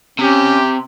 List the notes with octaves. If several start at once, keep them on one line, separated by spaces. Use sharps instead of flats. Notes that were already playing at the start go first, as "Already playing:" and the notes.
C3 C#4 G4